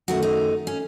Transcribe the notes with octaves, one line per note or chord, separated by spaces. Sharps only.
F#2 D#3 A3 F#4
D#4
C#4